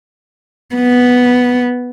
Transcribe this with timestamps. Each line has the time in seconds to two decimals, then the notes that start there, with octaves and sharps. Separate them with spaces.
0.75 B3